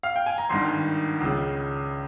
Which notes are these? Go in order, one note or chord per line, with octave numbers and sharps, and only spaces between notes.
F5
G5
G#5
A#5
G#1 G2 D#3 C6
C#2 C#3